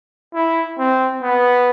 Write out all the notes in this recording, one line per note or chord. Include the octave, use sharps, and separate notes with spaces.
E4
C4
B3